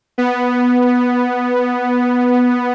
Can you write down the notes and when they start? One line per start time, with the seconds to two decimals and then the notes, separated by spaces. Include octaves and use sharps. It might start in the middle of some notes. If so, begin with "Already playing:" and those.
0.18 B3